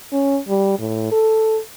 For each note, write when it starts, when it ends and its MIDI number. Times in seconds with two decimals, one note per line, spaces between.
0.13 0.39 61
0.48 0.76 55
0.79 1.09 45
1.12 1.59 69